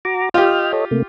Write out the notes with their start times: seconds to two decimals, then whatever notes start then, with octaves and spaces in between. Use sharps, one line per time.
0.05 F#4 A#5 D6
0.34 F4 G4 D#5 G5 F6
0.73 A4 C#5 D#5
0.91 C3 A3 A#3